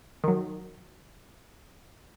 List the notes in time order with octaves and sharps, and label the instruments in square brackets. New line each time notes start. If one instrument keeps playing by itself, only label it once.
[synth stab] D#3 F#3